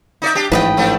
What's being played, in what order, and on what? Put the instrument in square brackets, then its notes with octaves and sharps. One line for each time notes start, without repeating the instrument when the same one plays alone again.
[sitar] D#4 D5 E5
D4 G4
[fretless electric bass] A1 G#2 E3 [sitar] F3 [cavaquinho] B4 D#5 G5
[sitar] F3 A3 D4